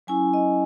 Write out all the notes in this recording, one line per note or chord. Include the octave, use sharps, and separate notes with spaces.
F#3 C#4 E4 G#5
D#5